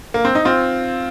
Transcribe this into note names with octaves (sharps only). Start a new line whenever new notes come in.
A#3
C4
D#4
C4 F4